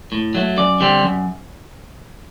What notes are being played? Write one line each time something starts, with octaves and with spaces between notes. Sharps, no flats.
A2
F#3 A3
F#2 D5
D3 G3 C4
F#2